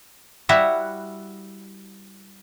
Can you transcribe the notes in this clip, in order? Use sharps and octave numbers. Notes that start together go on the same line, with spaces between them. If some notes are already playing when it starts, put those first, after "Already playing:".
G3 E4 F#4 E5 F#5